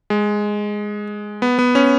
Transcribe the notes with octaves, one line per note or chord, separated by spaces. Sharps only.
G#3
B3
B3
C#4